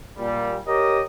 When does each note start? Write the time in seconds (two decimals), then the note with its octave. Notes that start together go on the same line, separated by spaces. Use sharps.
0.18 A#2 G3
0.67 G4 A#4 C#5 D#5